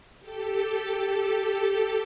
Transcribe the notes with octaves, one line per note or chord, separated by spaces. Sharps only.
G4 A4